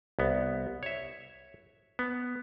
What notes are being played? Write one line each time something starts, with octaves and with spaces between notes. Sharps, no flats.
C2 B3
C#5 E5
B3